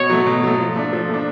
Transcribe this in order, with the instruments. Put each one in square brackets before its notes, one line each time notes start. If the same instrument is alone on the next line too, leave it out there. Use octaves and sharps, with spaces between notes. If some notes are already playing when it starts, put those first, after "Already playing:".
Already playing: [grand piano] B2 [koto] C#5
[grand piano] F#3 A3
B2
F#3 A3
F3
A3 D4
F3
A3 D4